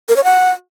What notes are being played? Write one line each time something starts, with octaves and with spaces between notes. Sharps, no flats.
A#4
C#5
F#5